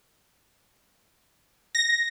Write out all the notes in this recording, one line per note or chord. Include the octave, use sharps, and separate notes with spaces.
A#6